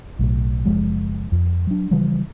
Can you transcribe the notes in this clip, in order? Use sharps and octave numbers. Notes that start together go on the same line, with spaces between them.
B1 A2
F#1 F3 G#3
F2
F#3 D4
C#3 E3 F3 G3